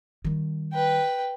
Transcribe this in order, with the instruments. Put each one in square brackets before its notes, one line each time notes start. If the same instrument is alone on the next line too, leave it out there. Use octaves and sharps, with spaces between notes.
[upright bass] D#3 G3
[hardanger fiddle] B4 G5